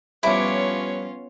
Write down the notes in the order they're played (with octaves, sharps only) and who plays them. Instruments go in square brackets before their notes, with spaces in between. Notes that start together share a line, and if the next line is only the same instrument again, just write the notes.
[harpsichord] G2 F3 [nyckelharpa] B3 C#5 [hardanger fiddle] C#4 F4 [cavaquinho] E4 D6